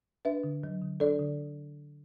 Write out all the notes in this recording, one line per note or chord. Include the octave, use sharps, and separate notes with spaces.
D4 B4 E5
D3
F#3
D3
D4 A4 D5
D3